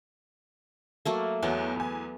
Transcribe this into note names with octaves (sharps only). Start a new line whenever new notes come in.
F#3 A3 A#3
E2 F#3 B3
E2 G#5